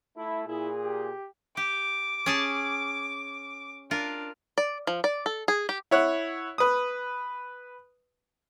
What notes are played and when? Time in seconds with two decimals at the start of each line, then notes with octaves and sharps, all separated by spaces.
0.17 A3 E4
0.47 A#2 E4 G#4
0.83 G4
1.57 G4 D6
2.26 C#4 G#4 A5
3.91 D4 F4 A#4
4.58 D5
4.87 F3
5.04 D5
5.26 A4
5.48 G#4
5.69 G4
5.91 E4 C#5 F#5
6.58 B4 D#6